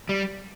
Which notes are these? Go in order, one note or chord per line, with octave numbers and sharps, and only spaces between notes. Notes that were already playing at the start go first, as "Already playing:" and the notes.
G3